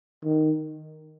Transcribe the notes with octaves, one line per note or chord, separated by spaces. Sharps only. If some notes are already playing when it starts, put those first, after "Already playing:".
D#3